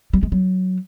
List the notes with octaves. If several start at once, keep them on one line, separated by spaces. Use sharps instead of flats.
G3
G#3
F#3